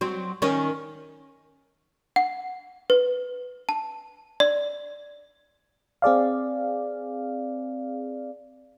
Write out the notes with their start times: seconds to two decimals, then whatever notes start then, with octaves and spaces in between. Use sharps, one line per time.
0.01 F#3 C4
0.42 D#3 C#4
2.16 F#5
2.90 B4
3.69 A5
4.40 D5
6.02 C4 G#4 D5 F5